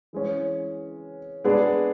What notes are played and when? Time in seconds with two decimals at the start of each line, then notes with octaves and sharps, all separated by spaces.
0.13 E3 G#3 C#4
1.44 G#3 B3 D4 G#4